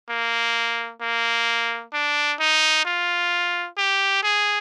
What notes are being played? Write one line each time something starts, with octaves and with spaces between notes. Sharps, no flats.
A#3
A#3
D4
D#4
F4
G4
G#4